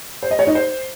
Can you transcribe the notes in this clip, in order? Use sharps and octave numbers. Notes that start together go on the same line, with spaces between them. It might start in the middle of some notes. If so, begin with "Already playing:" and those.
C5
D#5
C#5
D#4
C5